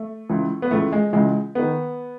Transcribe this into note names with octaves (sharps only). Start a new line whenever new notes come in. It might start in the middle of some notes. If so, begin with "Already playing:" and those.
Already playing: A3
C#2 C#3 E3
B3
C#2 C#3 E3 A3
G#3
C#2 C#3 E3 G#3
D#3 B3